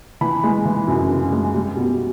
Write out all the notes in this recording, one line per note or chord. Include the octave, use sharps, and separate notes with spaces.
E3 B5
G#3
E3
F#2
C#3
G#3
G3
B2